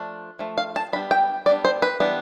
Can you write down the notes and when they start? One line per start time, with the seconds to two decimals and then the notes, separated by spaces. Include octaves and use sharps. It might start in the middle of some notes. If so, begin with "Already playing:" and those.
Already playing: F3 A3 D4
0.39 F3 A3
0.58 F5
0.76 A5
0.93 G3 B3 D4 B5
1.11 G5
1.46 G3 B3 D4 D5
1.65 C5
1.82 B4
2.00 E3 G3 B3 D4